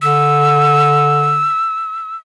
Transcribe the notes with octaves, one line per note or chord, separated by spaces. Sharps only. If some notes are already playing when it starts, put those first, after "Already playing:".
D3 E6